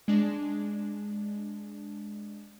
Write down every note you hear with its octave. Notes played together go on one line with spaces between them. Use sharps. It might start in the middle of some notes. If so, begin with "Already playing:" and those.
G#3 D4